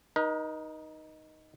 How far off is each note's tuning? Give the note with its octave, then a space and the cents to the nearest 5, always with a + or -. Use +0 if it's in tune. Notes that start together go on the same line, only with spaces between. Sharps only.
D#4 +0 A#4 +45